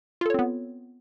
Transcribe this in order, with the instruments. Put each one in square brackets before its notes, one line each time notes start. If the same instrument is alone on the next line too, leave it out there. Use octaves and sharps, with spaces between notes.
[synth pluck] F4
A4
C#5
C4
B3